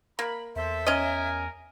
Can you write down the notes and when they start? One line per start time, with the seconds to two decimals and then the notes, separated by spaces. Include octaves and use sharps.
0.19 A#3 B5
0.56 E2 A4 C5 E5
0.87 C#4 A#4 D#5 G#5